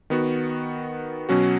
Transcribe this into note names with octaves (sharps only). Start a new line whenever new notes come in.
D#3 B3 F#4
B2 F#3 C#4 F#4